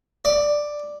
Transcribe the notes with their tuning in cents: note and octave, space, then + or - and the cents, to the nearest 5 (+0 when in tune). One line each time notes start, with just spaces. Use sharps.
D5 +5